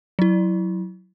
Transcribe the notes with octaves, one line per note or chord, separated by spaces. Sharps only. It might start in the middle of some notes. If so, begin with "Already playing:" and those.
F#3 E4